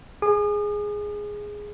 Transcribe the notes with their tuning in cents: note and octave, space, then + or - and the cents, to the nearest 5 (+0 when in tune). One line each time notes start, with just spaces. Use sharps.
G#4 +0 D#6 -40